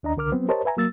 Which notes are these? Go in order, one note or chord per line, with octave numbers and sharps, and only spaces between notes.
D#2 D4 D#5 A#5
C2 D3 A#4 D6 F6
F#3 B3 C4
G4 A#4 C5 C#5 D#5 A5
B4 E5 G#5 A#5
F#3 A#3 E6 A6